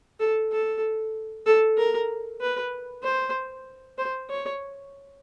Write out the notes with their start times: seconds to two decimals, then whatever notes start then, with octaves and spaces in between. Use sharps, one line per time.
0.20 A4
0.52 A4
1.46 A4
1.78 A#4
2.41 B4
3.04 C5
3.98 C5
4.30 C#5